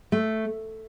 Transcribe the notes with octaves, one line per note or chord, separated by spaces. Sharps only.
A3